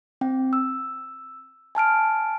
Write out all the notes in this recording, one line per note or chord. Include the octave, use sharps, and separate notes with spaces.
C4 G5
E6
G#5 A5 F6 D7